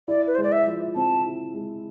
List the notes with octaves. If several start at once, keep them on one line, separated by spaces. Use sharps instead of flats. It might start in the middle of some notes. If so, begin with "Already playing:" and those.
E4 D5
B4
G#3 C5
D5
E5
F3
C4 A5
E4
G#3